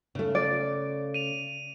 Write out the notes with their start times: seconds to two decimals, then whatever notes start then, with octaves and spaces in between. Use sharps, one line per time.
0.15 C#3 A3
0.35 D5
1.14 D#7 F7